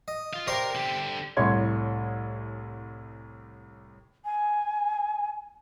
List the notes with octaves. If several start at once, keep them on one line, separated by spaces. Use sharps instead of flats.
D#5
F4 F5
C3 A#4 D5 A#5 C6
D3 G4
C2 A2 C#5 C6 G#6
G#5